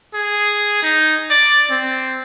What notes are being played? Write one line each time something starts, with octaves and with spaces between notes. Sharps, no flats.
G#4
D#4
D5
C4